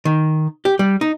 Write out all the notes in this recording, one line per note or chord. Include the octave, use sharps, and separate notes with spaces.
D#3
G4
G3
D#4